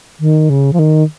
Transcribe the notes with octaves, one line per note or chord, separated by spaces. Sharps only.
D#3
C#3
F3
D#3